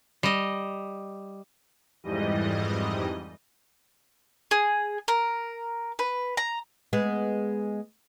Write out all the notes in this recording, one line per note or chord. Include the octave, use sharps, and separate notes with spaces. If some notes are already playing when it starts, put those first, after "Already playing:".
G3 D#5
F2 G#2 E3 G3 D#5
G#4
A#4
B4
A#5
G#3 B3